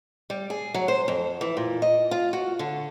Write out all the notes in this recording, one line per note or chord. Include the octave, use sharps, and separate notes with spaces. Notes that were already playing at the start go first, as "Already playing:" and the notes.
G3
G#4
F#3
C5
F2
E3
A#2
D#5
F4
F#4
D3